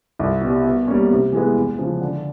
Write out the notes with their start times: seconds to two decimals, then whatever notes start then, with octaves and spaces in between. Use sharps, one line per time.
0.19 C2
0.41 B2 G3
0.64 B2
0.88 G3 A#3 C#4
1.10 C3
1.33 E3 G#3 B3
1.56 E2
1.78 C#3 F3
2.01 D3